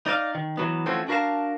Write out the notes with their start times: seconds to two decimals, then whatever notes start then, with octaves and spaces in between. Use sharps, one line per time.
0.06 D#4 D5 D#5 F5
0.35 D#3
0.57 E3 F#3 B3
0.86 E3 F3 A3 C4 C#4 F#4
1.08 D4 F#4 A#4 E5 F5 A5